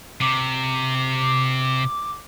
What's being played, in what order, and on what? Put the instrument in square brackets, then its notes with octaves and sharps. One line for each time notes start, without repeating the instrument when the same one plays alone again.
[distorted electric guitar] C3 [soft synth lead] D6